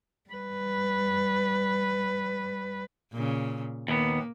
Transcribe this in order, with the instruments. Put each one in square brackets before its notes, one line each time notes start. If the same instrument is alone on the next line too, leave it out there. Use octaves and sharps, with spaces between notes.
[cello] G3 B4
[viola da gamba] A#2 C#3
[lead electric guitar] D#2 B3 [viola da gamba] A#3